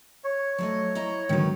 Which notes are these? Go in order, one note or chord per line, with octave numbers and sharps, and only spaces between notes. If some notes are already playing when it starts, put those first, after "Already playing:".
C#5
F#3 A3 D#5
E4 D#5 A#5
G#2 D3 D#3 F#3 B3